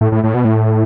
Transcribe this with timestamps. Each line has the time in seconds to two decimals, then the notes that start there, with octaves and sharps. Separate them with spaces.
0.01 A2
0.12 A2
0.24 A2
0.34 B2
0.45 A2